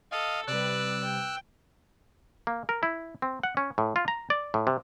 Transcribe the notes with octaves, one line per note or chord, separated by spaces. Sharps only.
A4 D#5 F5
C3 G3 B4 D5 E6 F#6
G5
A#3
A#4
E4
C4
F#5
C#4
A2
F4
A#5
D5
A2
C3